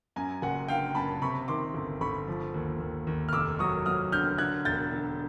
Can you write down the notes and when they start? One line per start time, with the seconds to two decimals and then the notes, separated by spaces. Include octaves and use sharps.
0.16 F#2 G#5 A#5
0.42 F#1 F#5 G#5
0.68 D3 F5 G5
0.95 F#2 A5 B5
1.22 C3 B5 C#6
1.48 D#3 C6 D6
1.74 G1
2.01 G1 B5 C#6
2.28 F3
2.54 D#2
2.80 D#2
3.07 D#2
3.29 F6
3.33 F1 D6 E6
3.59 F#3 C#6 D#6
3.86 F#3 D#6 F6
4.12 D3 F6 G6
4.38 D3 F#6 G#6
4.65 E1 G6 A6
4.92 D3